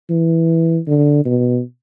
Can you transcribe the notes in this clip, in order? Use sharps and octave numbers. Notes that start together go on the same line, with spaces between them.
E3
D3
B2